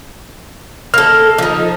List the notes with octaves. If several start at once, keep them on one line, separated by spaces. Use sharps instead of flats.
A#3 A4 F6
F3 D#4